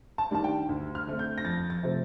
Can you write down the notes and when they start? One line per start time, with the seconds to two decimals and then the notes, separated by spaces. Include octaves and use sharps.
0.18 A5
0.31 D#3 G3 D4 A5
0.44 G5
0.69 D2
0.95 F6
1.07 D3 A3 C4
1.19 G6
1.38 A#6
1.45 F2 A6
1.70 A6
1.83 C3 F3 A3 C4